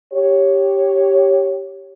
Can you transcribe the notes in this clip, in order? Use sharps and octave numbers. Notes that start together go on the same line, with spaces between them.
G4 C#5